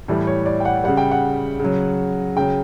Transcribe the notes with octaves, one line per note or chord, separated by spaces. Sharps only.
A2 E3 G3 A4
C#5
D5
G5
F#5
C#3 G3 F#5
G5
F#5
C#3 F#3
C#3 F#3 G5